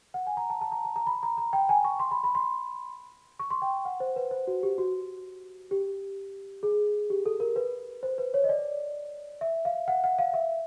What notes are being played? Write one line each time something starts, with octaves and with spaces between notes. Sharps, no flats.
F#5
G#5
A#5
A5
A5
A#5
A5
A#5
B5
A#5
A#5
G5
G#5
C#6
C6
B5
B5
C6
C#6
C6
G5
F#5
C5
B4
C5
F#4
G4
F#4
G4
G#4
G4
A4
A#4
B4
C5
B4
C#5
D#5
D5
E5
F5
F#5
F#5
F5
E5